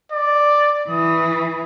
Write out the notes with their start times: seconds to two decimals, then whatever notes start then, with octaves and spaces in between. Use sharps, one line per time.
0.12 D5
0.89 E3 D#6